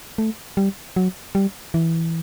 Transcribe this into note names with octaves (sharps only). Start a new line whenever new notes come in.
A3
G3
F#3
G3
E3